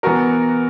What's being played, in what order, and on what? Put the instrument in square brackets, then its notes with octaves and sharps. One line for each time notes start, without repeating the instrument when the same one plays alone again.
[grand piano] E3 B3 F#4 A#4